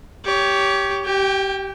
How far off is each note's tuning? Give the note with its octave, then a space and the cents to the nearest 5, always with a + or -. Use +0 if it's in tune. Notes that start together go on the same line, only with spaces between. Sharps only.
G4 +0 C#5 +20
G4 -20 G5 +25